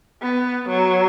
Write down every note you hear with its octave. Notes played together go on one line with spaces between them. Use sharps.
B3
F#3